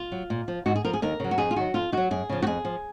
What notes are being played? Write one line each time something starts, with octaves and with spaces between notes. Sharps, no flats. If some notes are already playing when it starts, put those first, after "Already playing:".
Already playing: F4
F#3
A#2
F3
G#2 F#4
G#4
F3 A#4
G#4
D#2 A#4
C#3 F#3
F#4
F2 G#4
F4
D#3 F#3 F#4
F2 F4
D#3 F#3 F#4
F#2 G#4
C#3 F3
F#4
F2 G#4
F3